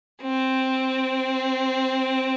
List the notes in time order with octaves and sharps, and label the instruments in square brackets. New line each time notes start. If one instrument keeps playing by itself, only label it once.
[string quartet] C4